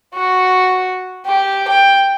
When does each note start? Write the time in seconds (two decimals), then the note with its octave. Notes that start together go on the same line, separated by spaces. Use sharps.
0.15 F#4
1.26 G4
1.68 G5